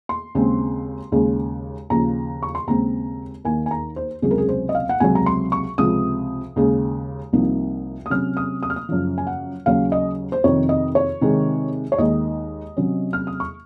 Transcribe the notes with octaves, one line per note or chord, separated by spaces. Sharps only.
C6
D#2 C#3 G#3 C4
D#2 C#3 G#3
D#2 C#3 F3 A#5
C#6
C6
D#2 C#3 G#3 C4 A#5
D#2 D#3 A#3 G#5
G#5
A#5
C5
C#2 C3 F#3 C#4 G#4
A#4
G#4
C5
D#5
F5
F#5
C#2 C3 F#3 G#5
A#5
C6
C#6
C#2 C3 F3 D#6
D#2 C#3 G#3
C2 C3 F3 A#3 D#4
D#6
C3 F#3 C#4 F6
D#6
D#6
F6
D#6
F#2 C#3 F3
G#5
F#5
D#2 C#3 F#3 C#4 F5
D#5
C5
F2 C3 D#3 C#5
D#5
C#5
C3 D#3 G#3
C#5
D#2 D#3 G#3 D#5
C3 F#3 C#4
F6
D#6
C#6